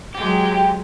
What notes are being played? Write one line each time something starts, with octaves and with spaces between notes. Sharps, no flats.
F#3 G#3 G4